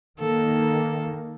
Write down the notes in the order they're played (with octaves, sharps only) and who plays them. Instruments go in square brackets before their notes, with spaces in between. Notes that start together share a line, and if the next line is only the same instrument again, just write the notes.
[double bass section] D#3 A#3 [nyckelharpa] A4